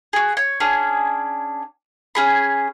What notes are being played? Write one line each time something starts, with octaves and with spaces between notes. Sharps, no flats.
F#4 G#4
C#5
C#4 D4 G#4 F#5
C#4 G#4 B5